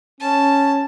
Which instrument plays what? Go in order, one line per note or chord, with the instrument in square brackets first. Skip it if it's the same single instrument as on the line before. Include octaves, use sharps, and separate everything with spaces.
[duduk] C#4 [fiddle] A5